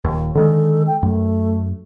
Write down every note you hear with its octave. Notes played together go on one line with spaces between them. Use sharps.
D#1 G#1 D#2
D3 D#3 G#3 A4
G5
F#2 A3